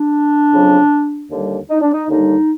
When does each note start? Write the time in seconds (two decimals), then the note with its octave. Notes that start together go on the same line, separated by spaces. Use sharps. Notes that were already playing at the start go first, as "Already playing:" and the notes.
Already playing: D4
0.51 F2 C#3 F#3
1.31 D#2 D3 G3
1.70 D#4
1.81 D4
1.93 D#4
2.09 D#2 D3 G3 D#4